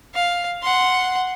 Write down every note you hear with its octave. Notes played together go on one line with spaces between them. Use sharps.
F5
F#5 C6